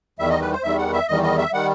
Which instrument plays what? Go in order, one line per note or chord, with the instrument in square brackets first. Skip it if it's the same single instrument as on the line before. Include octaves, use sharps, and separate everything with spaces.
[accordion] E2 D#3 G3 E5
D#5
B4
C5
E2 D#3 G3 E5
F#5
E5
E2 D#3 G3 D#5
D#5
E5
D#3 G3 F#5